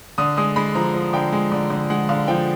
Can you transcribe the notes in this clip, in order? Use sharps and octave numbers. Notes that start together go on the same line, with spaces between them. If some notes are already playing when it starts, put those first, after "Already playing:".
D3 D#6
G#3 D#6
G#3 B5
F3 A#5
F3
D3 G5
G#3
D3
D3
G#3 F#5
D3 F5
F3 G5